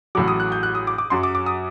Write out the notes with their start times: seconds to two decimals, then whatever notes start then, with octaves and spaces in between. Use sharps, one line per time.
0.15 A1 A2 F#3 D6
0.28 D#6
0.40 F#6
0.52 G6
0.63 F#6
0.75 D#6
0.87 D6
0.98 D6
1.10 F#2 F#3 C6
1.23 D6
1.35 D6
1.46 D#6